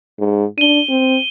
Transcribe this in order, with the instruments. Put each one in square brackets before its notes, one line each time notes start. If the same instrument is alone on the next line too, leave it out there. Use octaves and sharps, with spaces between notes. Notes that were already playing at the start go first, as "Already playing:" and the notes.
[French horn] G#2
[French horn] D4 [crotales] D#7 G7
[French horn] C4